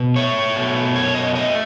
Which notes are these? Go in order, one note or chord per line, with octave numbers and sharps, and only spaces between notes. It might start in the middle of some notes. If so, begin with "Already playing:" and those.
Already playing: B2
A3 C#5
B2
F#2 C#5
D#5
A3 D#5